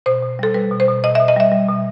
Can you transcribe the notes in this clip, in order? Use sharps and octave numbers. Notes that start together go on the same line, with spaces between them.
B2 C5
B2
G3 A4
G3 B4
B2
C5
B2
B2 D#5
E5
B2
D#5
G3 E5
G3
B2